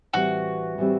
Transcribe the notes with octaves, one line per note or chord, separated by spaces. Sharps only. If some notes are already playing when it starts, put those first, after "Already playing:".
A2 E3 G3 C4 E4 F#4
A2 E3 G3 C4 E4